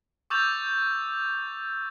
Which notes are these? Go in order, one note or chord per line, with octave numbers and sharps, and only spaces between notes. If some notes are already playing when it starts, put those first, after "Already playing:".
C#6 D6 E6 G6 A6 F7